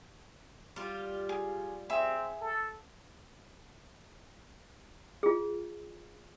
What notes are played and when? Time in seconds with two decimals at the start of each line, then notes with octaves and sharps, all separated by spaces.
0.76 G3 F4
1.29 G#4
1.90 C4 G#4 E5 B5
2.41 A4
5.23 F4 G#4